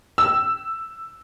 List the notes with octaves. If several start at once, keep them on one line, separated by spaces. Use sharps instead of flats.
E6